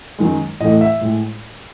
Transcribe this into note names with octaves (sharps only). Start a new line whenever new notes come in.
F#2 D#3 G#3
A2 E3 A3 D#5
E5
A2 G#3